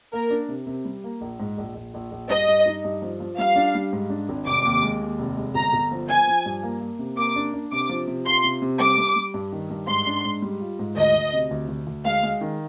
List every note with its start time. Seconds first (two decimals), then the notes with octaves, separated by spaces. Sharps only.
0.13 A#3 A#4
0.31 D4
0.49 C3
0.67 C3
0.85 G3
1.04 A#3
1.21 A#1
1.39 G#2
1.58 A#1
1.75 A#1
1.94 A#1
2.12 A#1
2.29 G2 D#5
2.48 G2
2.66 D#4
2.85 G2
3.02 F3
3.20 F3
3.38 G3 F5
3.56 D4
3.75 G3
3.92 G#2
4.10 D4
4.29 G#1
4.46 F1 D6
4.65 D#2
4.83 G#3
5.01 D#2
5.18 F1
5.36 G#3
5.54 G1 A#5
5.73 G1
5.91 F3
6.09 F3 G#5
6.27 F3
6.46 G2
6.63 A#3
6.81 A#3
6.99 C3
7.17 A#3 D6
7.36 D4
7.54 D4
7.72 C3 D6
7.89 F3
8.07 C3
8.26 F4 C6
8.44 C3
8.62 C3
8.79 G3 D6
8.98 G3
9.16 G3
9.34 G2
9.52 D#3
9.70 G2
9.88 G#2 C6
10.07 D4
10.25 G#2
10.42 G3
10.60 F4
10.79 G#2
10.97 D2 D#5
11.14 D2
11.33 C3
11.51 D2
11.69 D2
11.87 D2
12.05 G#3 F5
12.23 G#3
12.41 D#3